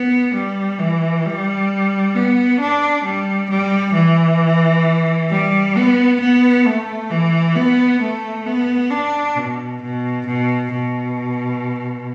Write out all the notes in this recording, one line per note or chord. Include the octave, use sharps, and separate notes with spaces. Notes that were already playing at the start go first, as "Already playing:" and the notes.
Already playing: B3
G3
E3
G3
B3
D4
G3
G3
E3
G3
B3
B3
A3
E3
B3
A3
B3
D4
B2
B2
B2
B2